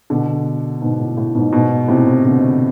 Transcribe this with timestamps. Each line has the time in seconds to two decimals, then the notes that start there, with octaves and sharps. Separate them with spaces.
0.10 B2 D3
0.81 G#2 B2
1.00 A2
1.17 A2
1.35 G#2 B2
1.52 G#2 B2
1.88 A2 C3
2.25 B2 D3